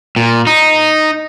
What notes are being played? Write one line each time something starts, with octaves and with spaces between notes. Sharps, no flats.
A#2
D#4